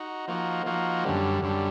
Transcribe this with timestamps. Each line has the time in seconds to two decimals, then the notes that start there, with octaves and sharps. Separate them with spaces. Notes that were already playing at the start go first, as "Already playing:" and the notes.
Already playing: D#4 F#4
0.28 F3 A#3 D#4 F#4
0.66 F3 A#3 D#4 F#4
1.04 F#2 D3 G3
1.43 F#2 D3 G3